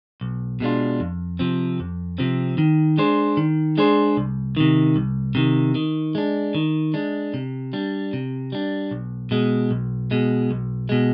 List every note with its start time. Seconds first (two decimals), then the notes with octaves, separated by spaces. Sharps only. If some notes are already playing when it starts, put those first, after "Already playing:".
0.21 B1
0.60 B2 G#3 D4 F4
1.00 F2
1.39 C3 F3 C4
1.80 F2
2.18 C3 F3 C4
2.58 D#3
2.98 G#3 D4 G#4 C5
3.37 D#3
3.77 G#3 D4 G#4 C5
4.17 C2
4.57 C3 D#3
4.96 C2
5.35 C3 D#3
5.75 D#3
6.15 G#3 D4
6.55 D#3
6.94 G#3 D4
7.34 C3
7.73 G3 D4
8.13 C3
8.52 G3 D4
8.91 B1
9.31 B2 G#3
9.71 B1
10.11 B2 G#3
10.51 B1
10.89 B2 G#3